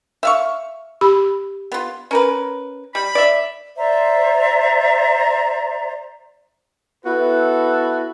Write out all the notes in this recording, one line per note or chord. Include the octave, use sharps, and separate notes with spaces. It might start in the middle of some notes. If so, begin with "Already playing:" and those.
E5 F5 C#6
G4 B5
B3 F4
C#4 A#4 B4
G3 B5
D5 E5
C5 D5 E5 A#5
B3 E4 F#4 A4 B4